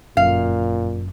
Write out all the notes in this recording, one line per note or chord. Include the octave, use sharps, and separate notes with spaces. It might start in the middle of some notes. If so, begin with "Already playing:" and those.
G1 F#2 A#2 F5